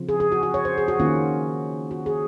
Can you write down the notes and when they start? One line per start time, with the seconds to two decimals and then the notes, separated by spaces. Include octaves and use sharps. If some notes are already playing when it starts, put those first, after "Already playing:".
Already playing: C#3 F3 C4 F4
0.09 G#4
0.20 G#4
0.32 F#4
0.43 F#4
0.54 C#5
0.65 C5
0.78 G#4
0.88 F#4
1.00 D#3 A#3 C#4 F4
1.91 F#4
2.06 G#4